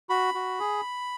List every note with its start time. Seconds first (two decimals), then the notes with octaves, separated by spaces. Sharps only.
0.09 F#4 B5
0.34 F#4
0.60 G#4